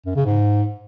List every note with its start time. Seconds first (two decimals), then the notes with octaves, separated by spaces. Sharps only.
0.06 F#2
0.16 C#3
0.25 G#2